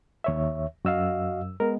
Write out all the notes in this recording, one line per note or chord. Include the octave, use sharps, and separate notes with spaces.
D#2 C#5 E5
F#2 F#4 D#5 F5 E6
G#3 B3 A#4